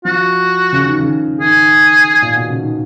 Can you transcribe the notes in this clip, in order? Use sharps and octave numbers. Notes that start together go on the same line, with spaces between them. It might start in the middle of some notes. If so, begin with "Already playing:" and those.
F3 F#4
C#3
D#3
C#3
D#3 G#4
A#2
B2
C#3
D#3